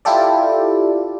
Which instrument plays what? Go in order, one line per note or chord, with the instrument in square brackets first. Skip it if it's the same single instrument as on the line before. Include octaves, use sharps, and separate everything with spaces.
[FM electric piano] E4 F4 G4 A4 D5